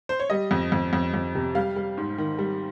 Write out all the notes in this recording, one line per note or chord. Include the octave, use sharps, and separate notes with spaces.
C5
C#5
G3 D#5
F2
F2
F2
F2
C3
G3 F5
G3
G#2
D#3
G3